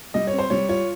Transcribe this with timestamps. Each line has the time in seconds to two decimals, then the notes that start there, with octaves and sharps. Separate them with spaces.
0.14 G3 D#5
0.27 C#5
0.33 C4
0.39 C5
0.50 G3 C#5
0.69 F4 C#5